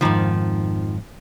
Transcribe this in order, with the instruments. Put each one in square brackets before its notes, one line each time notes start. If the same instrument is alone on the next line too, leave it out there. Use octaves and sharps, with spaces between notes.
[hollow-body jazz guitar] C2 F2 G#2 [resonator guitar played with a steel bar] D#3 F3